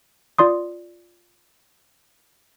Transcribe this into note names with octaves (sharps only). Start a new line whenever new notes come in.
F4 D5 C6 D#6